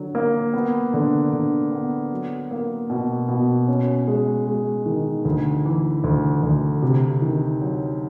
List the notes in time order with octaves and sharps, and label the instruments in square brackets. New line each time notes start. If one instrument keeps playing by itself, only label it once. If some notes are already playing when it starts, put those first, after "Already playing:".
Already playing: [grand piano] D3 F#3
A#3
B3
D3
D3
B3
F#3
A#3
B2
B2
C#4
G#3
G#3
D#3
D2
E3
D2
D2
C3
D#3
F#3